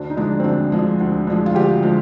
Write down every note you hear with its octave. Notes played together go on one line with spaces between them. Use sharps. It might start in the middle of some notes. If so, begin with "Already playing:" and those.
Already playing: D2 D4
D#4
D3 F3 G#3 D4
C4
D2 D4
D3 F3 G#3
D2
D3 F3 G#3
F4
D2 G4
D3 F3 G#3